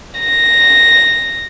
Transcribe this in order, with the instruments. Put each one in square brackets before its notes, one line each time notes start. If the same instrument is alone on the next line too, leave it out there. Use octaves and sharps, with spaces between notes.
[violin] A#6